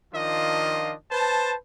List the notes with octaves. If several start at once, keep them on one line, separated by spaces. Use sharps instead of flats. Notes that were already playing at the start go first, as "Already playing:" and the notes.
D#3 F3 D4 F4 D#5
B4 C5 A5